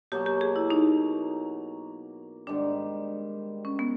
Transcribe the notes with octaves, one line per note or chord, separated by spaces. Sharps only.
B2 F#3 A#3 G4
G4
G#4
E4
D#4
G#2 D#3 G3 D4
C#4
B3